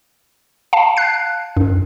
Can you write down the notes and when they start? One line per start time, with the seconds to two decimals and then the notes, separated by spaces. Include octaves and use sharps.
0.73 F5 A5
0.97 F#6 C7
1.57 F#2